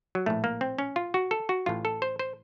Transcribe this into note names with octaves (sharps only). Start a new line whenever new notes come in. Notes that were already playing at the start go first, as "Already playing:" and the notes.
F#3
A#1 A2 A3
A#3
C4
C#4
F4
F#4
A4
F#4
A1 A2 F4
A4
C5
C5